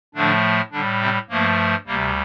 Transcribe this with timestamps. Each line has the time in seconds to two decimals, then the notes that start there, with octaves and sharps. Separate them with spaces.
0.15 A2 D3 F3 A3 D4
0.72 A2 D3 G3 D4
1.01 C3 C4
1.29 G2 F3 A3 A#3
1.87 D2 C3 G3 A#3